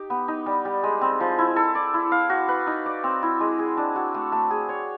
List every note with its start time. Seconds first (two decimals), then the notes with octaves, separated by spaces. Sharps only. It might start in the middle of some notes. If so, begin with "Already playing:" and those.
Already playing: D#4 G4
0.10 B3
0.28 D#4
0.46 G3
0.65 G3
0.84 G#3
1.01 C4
1.20 F3
1.39 E4
1.56 A4
1.75 D5
1.94 E4
2.12 F5
2.30 F#4
2.49 B4
2.67 D#4
2.86 D5
3.04 C4
3.23 E4
3.40 G#3
3.59 G#4
3.77 D4
3.96 F#4
4.14 A3
4.32 A3
4.50 G#4
4.69 C#5